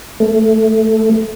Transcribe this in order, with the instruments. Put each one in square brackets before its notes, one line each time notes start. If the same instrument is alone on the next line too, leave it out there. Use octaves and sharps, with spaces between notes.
[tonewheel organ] A3